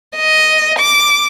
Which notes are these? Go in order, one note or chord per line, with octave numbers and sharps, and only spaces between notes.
D#5
D6